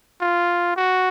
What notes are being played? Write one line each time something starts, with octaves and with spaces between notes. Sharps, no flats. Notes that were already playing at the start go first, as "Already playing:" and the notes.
F4
F#4